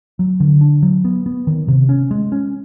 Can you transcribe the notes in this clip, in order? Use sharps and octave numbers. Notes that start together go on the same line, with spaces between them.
F#3
D3
D4
F#3
B3
B3
D#3
C3
C#4
G#3
C#4